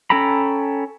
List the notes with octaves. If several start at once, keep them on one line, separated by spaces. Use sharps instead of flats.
C#4 A4 G5 A#5 B5